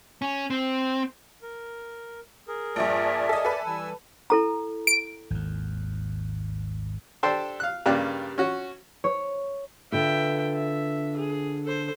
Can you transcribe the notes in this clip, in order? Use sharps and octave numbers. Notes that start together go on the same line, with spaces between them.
C#4
C4
A#4
G#4 A#4
A#1 G2 D5 E5 G#5 A5
A4 D#5
A4 B4
E3 G3 G#5 E6
E4 A4 A#5
D7
G#1 D#2
D4 G4 A4 C5 G5 C6
F5 F#6
G2 C#3 A#3 G4 D5 F#6
C#4 F#4
C#5
D3 F4 B4 E5 G5
E5
G#4
A4 C5